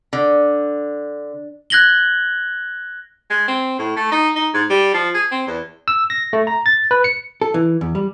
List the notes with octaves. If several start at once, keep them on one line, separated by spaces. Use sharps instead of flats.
D3
F#6 G#6 A#6 F#7 G7
G#3
C4
A2
A3
D#4
D#4
G#2
G3
F3
G#4
C4
E2
E6
A#6
A3
A#5
A6
B4
C#7
A4
E3
E2
G3